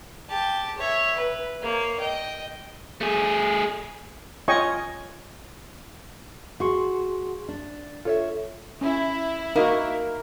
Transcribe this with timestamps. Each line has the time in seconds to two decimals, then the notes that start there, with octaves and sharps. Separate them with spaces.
0.29 G4 A5
0.78 C#5 E5
1.16 B4
1.62 A#3 C#5
2.00 D#5 G5
3.01 A3 G#4
4.48 F4 C#5 D#5 G5 G#5 C#6
6.60 F#4 G#4 C6 C#6
7.48 D4
8.05 F4 A4 C#5 E5
8.81 C#4 E4
9.56 A#3 D#4 F#4 A#4